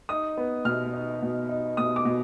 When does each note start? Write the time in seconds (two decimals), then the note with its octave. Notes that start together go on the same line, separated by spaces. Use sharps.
0.09 D#4 D#6
0.37 B3
0.65 B2 F6
0.94 D#4
1.22 B2
1.49 D#4
1.77 B2 D#6
1.96 D6
2.05 B2